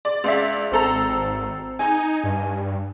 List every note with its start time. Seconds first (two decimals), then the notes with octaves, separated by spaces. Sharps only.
0.05 D5
0.24 C#2 D5 E5
0.72 G#1 C4 A4 A#5
1.79 D#4 G#5
2.24 G2